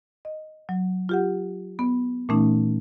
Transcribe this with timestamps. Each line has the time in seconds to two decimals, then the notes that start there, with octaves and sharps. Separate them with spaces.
0.25 D#5
0.69 F#3
1.09 F4 G4 F#5
1.79 B3
2.29 A#2 E3 A3 C#4 D#4